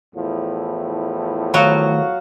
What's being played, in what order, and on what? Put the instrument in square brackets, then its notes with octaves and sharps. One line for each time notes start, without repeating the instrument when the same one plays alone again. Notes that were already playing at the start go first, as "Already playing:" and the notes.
[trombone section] E2 A2 F3
[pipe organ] D#3 A3 [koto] F#3 F#4 [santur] F5 F#5 C#6